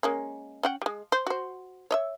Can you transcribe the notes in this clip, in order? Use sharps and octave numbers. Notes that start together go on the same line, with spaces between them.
G#3 A#3 C#4
C#4 F#5 G5
G3 G#3
C5
F#4 C5
C#5 D#5 E5